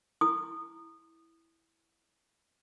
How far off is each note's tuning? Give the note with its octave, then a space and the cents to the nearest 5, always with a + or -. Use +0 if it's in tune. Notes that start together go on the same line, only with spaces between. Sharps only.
E4 +0 D#6 -20